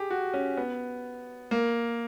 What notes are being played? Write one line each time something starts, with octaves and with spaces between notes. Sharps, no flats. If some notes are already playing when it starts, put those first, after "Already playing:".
Already playing: G4 G#4
F#4
C#4
B3
A#3